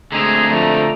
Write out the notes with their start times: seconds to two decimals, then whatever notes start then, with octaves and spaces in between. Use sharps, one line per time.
0.12 D3 G#3 A3 C4 G#4 A#5
0.50 F2 F3 A3 D5